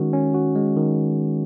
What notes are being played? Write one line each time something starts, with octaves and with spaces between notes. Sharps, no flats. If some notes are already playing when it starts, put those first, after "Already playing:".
Already playing: D#3 G#3 C#4 F#4
C#4
F#4
G#3
D#3